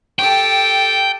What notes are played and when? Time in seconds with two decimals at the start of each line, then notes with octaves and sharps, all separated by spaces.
0.19 G4 A4 G5